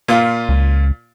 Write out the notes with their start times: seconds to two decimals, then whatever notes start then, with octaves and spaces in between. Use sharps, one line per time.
0.08 A#2 F4
0.49 C#2